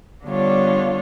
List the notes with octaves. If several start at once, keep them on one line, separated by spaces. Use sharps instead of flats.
D3 G3 B3 D4 F4 C#5